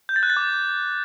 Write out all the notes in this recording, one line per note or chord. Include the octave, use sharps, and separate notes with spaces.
G6
A6
F#6
A6
D6